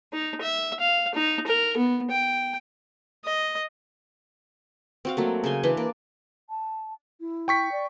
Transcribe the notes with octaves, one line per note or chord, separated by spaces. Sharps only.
D#4
E5
F5
D#4
A#4
B3
G5
D#5
C4 F#4 F5
F#3 A3 A#3
C#3 C5 G#5 C6
E3 D4 B4 C6
A#3 D5
A5
E4
G5 C#6 B6
D5